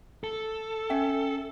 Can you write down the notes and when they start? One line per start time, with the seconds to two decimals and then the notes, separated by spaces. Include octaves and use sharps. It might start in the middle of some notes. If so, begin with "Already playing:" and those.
0.24 A4
0.90 C#4 E5 G5